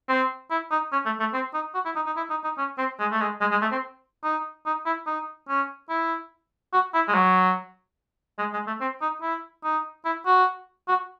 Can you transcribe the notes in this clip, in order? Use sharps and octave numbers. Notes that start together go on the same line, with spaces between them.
C4
E4
D#4
C#4
A3
A3
C4
D#4
F#4
E4
D#4
D#4
E4
D#4
D#4
C#4
C4
G#3
A3
G#3
G#3
G#3
A3
C4
D#4
D#4
E4
D#4
C#4
E4
F#4
E4
G#3
F#3
G#3
G#3
A3
C4
D#4
E4
D#4
E4
F#4
F#4